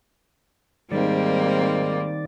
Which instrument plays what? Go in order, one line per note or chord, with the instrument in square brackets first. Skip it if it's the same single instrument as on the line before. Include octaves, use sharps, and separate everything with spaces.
[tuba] G#2 [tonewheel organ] D#3 D5 [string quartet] G3 A#3 C4